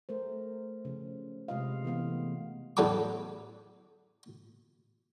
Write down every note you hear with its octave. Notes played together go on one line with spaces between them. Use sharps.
A3 A#4 C5
C#3 F3
C3 G#3 F4 B4 D#5 F5
E3 A3 B3 F5
A1 E2 F#3 A4 G5 D6